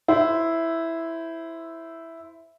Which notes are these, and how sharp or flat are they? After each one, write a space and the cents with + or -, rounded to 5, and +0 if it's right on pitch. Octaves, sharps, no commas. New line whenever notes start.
E4 +0 C5 -15